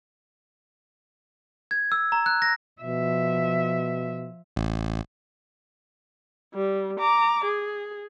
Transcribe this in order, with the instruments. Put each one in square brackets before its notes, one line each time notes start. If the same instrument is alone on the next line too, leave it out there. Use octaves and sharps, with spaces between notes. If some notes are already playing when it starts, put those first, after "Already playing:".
[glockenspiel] G#6
E6
A#5
F#6
A#6
[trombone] B2 [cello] F3 E5
[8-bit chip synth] A1
[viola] G3
A#5 D6
G#4